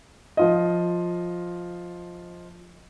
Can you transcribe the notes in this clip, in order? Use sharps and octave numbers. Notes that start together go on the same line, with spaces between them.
F3 F4 D#5